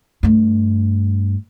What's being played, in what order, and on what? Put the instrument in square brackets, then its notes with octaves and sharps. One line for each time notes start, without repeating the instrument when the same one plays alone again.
[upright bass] G2 A3